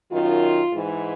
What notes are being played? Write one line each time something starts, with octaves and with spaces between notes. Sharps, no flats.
F#2 D#3 F4
G#2 E3